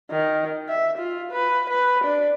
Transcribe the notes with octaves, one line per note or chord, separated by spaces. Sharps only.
D#3
E5
F4
B4
B4
D4